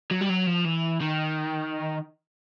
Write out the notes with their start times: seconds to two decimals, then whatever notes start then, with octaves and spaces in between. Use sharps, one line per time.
0.11 F#3
0.21 G3
0.29 F#3
0.47 F3
0.65 E3
1.01 D#3